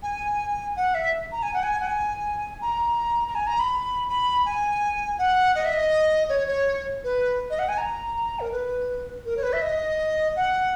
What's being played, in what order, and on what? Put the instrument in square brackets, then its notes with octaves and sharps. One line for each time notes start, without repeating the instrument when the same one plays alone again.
[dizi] G#5
F#5
E5
A#5
G#5
F#5
G#5
F#5
G#5
A#5
A#5
G#5
A#5
B5
B5
G#5
F#5
D#5
E5
D#5
C#5
C#5
B4
D#5
F#5
G#5
A#5
A#4
B4
A#4
C#5
B4
E5
D#5
F#5